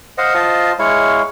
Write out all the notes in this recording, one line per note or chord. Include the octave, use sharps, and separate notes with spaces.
C5 D#5 F5 F#5
F4 C5 D#5 A5
G#3 E4 C#5 F5